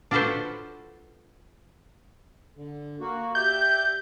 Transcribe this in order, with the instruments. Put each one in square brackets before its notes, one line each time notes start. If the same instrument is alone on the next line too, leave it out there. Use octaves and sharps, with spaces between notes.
[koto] D4 F4 F#4 A4 B4 C5
[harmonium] D3
A#3 F#4
[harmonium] G4 D5 E5 [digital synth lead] G6